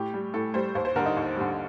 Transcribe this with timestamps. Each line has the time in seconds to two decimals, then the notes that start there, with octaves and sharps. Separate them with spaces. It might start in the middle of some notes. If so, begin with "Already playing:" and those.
Already playing: A2 G4
0.14 G3
0.34 A2 A4
0.54 G3 C5
0.75 D#2 C5
0.85 C5
0.96 D3 G3 A#4
1.06 D#4
1.17 D#2
1.36 D3 G3